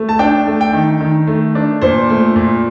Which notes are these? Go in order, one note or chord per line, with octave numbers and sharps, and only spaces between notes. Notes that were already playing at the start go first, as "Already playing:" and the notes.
Already playing: A3
A5
D4 G5
A3
G5
D#3
D#3
A3
D4
A#2 C5
A3
A#2